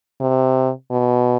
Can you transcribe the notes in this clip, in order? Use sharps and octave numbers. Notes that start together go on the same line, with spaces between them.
C3
B2